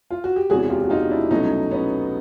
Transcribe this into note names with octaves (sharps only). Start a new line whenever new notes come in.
F4
F#4
G4
E1 E2 C3 F#4 G#4
F4 G4
F#4
D#4 F4
D4 E4
C2 B2 F#3 A3 C#4 D#4
B3 C#4